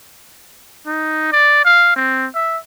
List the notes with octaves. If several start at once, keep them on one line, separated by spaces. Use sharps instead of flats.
D#4
D5
F5
C4
E5